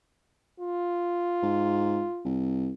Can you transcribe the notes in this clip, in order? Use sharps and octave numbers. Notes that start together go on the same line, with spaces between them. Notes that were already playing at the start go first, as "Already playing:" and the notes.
F4
G#2
C2